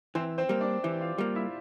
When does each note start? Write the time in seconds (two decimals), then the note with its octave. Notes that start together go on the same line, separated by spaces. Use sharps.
0.15 E3 C4 C5
0.38 C4 C5
0.49 G3 A#3
0.61 D4 D5
0.83 E3 G4 G5
1.01 F4 F5
1.18 G3 A#3 F4 F5
1.35 E4 E5